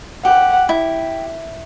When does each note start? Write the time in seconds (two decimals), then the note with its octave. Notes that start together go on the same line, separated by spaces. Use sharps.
0.25 G4 F#5
0.69 E4